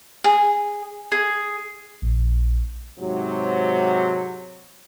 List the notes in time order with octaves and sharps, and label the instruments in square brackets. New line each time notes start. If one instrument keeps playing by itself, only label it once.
[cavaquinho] G#4
[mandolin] G#4
[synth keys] A#1
[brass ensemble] G#2 C3 F#3